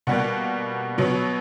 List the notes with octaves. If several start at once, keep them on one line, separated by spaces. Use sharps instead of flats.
B2 G3 A#3 F#5
B2 F#3 B3